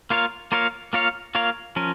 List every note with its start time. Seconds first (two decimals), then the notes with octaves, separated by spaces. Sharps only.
0.10 A#3 F4 A#4 C#5 F5
0.52 A#3 F4 A#4 C#5 F5
0.93 A#3 F4 A#4 C#5 F5
1.35 A#3 F4 A#4 C#5 F5
1.76 F3 C#4 A#4